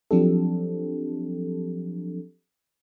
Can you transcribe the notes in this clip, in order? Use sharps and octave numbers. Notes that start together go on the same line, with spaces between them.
F3 F#3 C4 D4 G4 A4